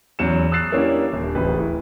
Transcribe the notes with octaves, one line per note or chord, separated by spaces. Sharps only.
E2 F#3 C#4 C#7 E7
D#6 E6 F#6 A6 C7 E7
A#3 C#4 D4 E4 G4
D#1
D1 A1 B4
E4